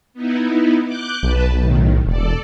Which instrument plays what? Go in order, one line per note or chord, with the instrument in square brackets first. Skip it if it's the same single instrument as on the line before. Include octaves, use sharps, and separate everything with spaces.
[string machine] B3 D#4 E4
D6 F#6 G6
[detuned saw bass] B1 [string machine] B4 A5
[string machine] A2 D#3
[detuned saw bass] E1 [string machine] A4 D5